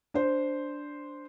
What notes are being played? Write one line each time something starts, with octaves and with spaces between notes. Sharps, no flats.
D4 C5